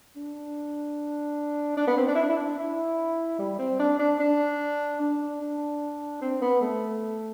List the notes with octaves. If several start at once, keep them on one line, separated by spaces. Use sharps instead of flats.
D4
D4
B3
C4
D4
E4
D4
E4
D4
E4
G3
C4
D4
D4
D4
D4
D4
C4
B3
A3